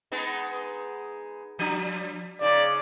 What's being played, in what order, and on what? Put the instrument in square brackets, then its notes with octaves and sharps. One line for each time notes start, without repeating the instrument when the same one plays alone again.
[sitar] G#3 B3 D#4
F3 D4
[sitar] C#3 D#4 [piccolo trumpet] D5